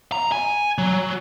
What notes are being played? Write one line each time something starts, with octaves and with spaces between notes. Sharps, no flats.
A#5
G#5
F#3